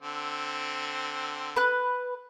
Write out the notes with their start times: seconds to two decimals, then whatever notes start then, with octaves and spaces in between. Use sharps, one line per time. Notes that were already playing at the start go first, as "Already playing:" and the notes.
0.02 D3 C4
1.56 B4 F#6